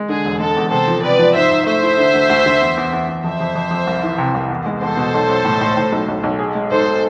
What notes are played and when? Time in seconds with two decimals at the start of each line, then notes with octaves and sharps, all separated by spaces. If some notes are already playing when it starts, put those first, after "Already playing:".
Already playing: G#3
0.09 D3 G#4
0.25 E1
0.40 G#3 A4
0.57 E2
0.71 C3 A4 C5
0.87 F3
1.03 C3 B4 D5
1.19 F3
1.35 G#2 C5 E5
1.51 G#2
1.66 A3 C5 E5
1.82 E4
1.98 D3
2.14 D2
2.29 D2
2.46 D2
2.61 E2
2.77 E2
2.93 E2
3.08 E2
3.24 F2 C5 E5
3.40 F2
3.55 F2
3.71 F2
3.87 C2
4.03 E3
4.18 C3
4.34 C2
4.50 E2
4.66 G#3
4.81 E2 A4 C5
4.97 B2
5.14 B1
5.29 B1
5.44 A2
5.61 A2
5.77 A2
5.92 B1
6.08 B1
6.23 B1
6.39 G#4
6.55 G#3
6.71 G#2 A4 C5